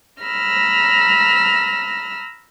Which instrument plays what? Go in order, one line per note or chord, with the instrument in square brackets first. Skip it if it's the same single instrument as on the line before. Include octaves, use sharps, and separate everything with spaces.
[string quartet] A#5 B5 E6 F6 A#6